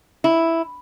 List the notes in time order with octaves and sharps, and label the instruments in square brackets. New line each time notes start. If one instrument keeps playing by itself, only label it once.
[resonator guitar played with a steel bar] E4